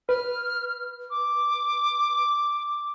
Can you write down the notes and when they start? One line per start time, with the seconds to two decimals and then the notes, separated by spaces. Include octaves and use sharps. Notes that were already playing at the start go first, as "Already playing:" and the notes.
0.09 B4 F6
1.10 D6